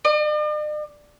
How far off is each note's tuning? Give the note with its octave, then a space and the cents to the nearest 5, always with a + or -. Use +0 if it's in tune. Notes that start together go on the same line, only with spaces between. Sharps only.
D5 +45